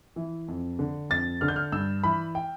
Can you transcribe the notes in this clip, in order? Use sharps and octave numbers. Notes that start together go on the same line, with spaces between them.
E3
F2
D3
F2 A6
D3 F6
G6
F6
G2 E6
E3 B5
G5